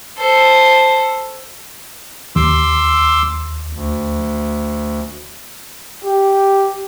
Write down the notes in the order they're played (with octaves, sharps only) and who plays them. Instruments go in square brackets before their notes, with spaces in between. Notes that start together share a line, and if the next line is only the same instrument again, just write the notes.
[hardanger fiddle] A4 C5
[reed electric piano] D#2 [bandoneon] C6 D6 E6
[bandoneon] D2
[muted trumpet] G4